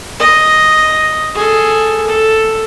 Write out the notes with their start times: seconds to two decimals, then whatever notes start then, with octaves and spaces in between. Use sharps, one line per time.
0.20 D#5
1.34 G#4 A4
2.07 A4